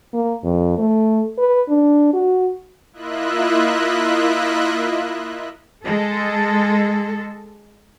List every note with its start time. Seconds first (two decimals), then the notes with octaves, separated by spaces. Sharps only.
0.13 A#3
0.44 F2
0.78 A3
1.38 B4
1.68 D4
2.13 F#4
2.93 A#3 E4 F4 D#5 E5 F#6
5.85 G#3 A4